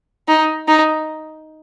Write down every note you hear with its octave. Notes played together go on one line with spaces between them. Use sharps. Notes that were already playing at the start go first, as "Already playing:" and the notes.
D#4
D#4